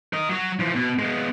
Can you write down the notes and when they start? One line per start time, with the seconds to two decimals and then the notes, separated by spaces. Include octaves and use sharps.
0.13 A#4 D#5
0.29 F#3 F#4
0.60 E3 F3
0.75 B2
0.99 G#3 B3